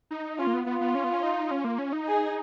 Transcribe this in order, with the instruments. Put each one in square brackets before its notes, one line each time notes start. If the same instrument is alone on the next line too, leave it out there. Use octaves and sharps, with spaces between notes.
[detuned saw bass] D#4
[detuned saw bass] C#4 [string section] F4
[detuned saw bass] A#3
B3
[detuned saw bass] B3 [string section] F4
[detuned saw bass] B3
C#4
B3
C#4
D#4
C#4
A#3
C#4
D#4
[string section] G#4